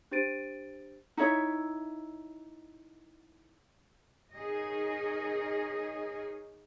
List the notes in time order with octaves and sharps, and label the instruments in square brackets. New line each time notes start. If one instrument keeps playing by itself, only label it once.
[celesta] D4 G4 C5 A6 D7 D#7
[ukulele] D#4 E4 C#5 E5
[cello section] D#4 G#4 A#4 C#5 D#5